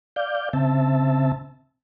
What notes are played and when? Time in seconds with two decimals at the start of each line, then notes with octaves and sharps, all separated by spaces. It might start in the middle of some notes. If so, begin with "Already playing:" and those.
0.16 D5 F5 G6
0.53 C#3 C4 E5 A5